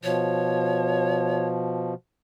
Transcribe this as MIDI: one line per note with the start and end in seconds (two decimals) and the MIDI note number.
0.04 1.94 47
0.04 1.94 53
0.04 1.46 73